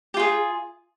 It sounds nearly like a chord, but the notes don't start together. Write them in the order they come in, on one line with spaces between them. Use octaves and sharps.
G4 F4 G#4